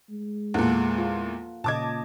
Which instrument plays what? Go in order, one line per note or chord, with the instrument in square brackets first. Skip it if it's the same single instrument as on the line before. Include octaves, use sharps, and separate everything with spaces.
[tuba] G#3
[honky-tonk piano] E2 A#2 [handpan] A#3 A4 F#5
[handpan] F4
[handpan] A#2 C#3 D#5 [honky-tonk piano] A5 D6 G#6